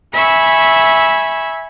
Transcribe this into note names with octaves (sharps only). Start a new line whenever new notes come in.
E5 G#5 B5 C#6 E6